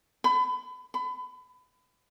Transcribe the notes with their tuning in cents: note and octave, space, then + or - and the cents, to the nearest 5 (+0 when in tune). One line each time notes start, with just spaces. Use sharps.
B5 +30
B5 +30